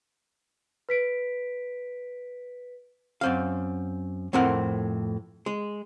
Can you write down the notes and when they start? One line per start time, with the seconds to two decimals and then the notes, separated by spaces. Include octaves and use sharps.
0.89 B4 B6 D7
3.21 F#2 C4 F5
4.33 F2 A2 C4 A#4 F#5
5.46 G#3